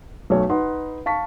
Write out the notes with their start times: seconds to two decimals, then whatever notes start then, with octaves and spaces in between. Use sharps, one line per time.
0.30 B1 A3 C#5
0.49 D#4 B4 F#5 C6
1.06 F5 A5 C#6 B6